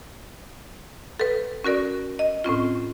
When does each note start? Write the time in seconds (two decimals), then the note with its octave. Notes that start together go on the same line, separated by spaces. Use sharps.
1.20 A4 B4
1.64 C#4 F#4 A#4 D5
2.19 D#5
2.44 A2 C4 C#4 F4